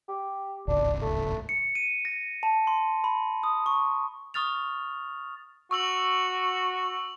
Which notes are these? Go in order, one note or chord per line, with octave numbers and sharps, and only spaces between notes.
G4
D1 G#1 C#2 D4
A3
C#7
D#7
A#6
A5
C6
B5
D#6
C#6
C#6 D#6 F6 A6 F7
F#4 C#6 E6 F#7